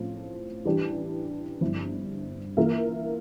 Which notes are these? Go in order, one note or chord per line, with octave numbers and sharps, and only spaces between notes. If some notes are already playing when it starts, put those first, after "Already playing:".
Already playing: A2 F3 C4 F4
E3 G3 D4 G4
G1 G2 F3 C4 E4
E3 A#3 F4 A#4 E5